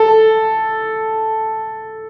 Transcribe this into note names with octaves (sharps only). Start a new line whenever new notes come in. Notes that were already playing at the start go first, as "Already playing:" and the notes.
Already playing: A4